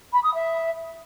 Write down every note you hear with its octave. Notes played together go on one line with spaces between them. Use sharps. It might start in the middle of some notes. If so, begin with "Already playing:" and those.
B5
D#6
E5